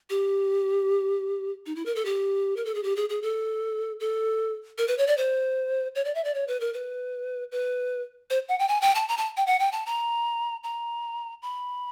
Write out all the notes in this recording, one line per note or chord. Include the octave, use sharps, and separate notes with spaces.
G4
D#4
E4
A#4
A4
G4
A#4
A4
G#4
G4
G#4
G#4
A4
A4
A#4
B4
C#5
D5
C5
C#5
D5
E5
D5
C#5
B4
A#4
B4
B4
C5
F#5
G5
G#5
G5
A5
A#5
A5
G5
F#5
G5
A5
A#5
A#5
B5